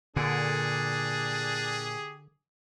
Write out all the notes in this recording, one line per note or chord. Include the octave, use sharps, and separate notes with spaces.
A#2 D3 D4 G4 G#4